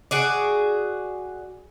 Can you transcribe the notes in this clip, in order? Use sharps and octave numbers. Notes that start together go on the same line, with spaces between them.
F#4 G#4 D5